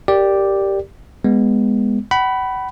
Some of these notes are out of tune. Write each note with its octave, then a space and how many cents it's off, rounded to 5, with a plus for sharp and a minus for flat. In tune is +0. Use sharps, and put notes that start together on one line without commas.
G4 +0 A#4 -15 D5 +0
G#3 -10 B3 +0
F#5 +40 B5 +0